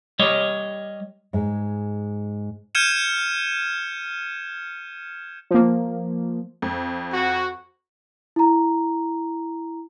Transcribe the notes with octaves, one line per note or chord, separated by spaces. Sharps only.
G3 C#5 D#5
G#2 G#3
F6 G6 G#6 C#7 D#7 E7
F3 A#3
F2
F#4
E4 A#5